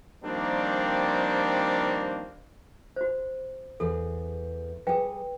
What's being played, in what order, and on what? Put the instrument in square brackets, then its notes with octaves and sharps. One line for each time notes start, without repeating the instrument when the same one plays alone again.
[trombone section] D#3 F3 G3 A#3 C4 D4
[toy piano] F#4 C5
[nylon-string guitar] E2 G#4 B4 [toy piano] A4
[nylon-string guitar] G3 G#4 [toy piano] B4 G5